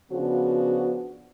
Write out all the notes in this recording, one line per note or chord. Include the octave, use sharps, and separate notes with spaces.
C#3 F3 B3 D4 F#4